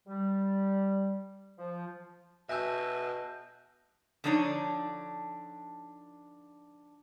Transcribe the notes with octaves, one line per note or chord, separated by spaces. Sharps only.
G3
F3
B2 E5 G#5 A5 E6 G6 A#6
D3 F3 D4 D#4 C#5